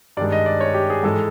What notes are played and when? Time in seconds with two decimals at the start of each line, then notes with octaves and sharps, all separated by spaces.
0.17 G2 D5
0.20 D#3 G#3
0.32 D#5
0.46 D5
0.61 C#5
0.74 G4
0.90 G#4
1.03 G#2 E3 G#3 A4